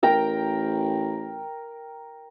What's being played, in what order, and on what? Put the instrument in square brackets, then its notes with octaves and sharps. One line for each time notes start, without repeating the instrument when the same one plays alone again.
[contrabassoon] A1 [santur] A#4 G5 A#5